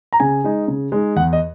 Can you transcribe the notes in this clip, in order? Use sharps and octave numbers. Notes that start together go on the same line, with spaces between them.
A#5
C#3 G#5
G#3 D#4
C#3
G#3 D#4
E2 F#5
D#5